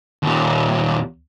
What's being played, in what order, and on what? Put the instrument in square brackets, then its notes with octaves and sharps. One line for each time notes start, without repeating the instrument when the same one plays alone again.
[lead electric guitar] D#2 A#2